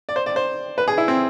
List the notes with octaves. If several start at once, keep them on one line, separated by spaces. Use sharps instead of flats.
D5
C5
D5
C5
B4
G#4
E4
C4